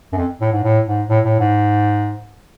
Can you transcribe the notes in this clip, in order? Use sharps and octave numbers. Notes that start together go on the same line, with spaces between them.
F#2
F2
A2
G#2
A2
G#2
A2
A2
G#2